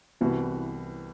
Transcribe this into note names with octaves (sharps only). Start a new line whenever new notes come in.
C2 C3 E3 B3 F#4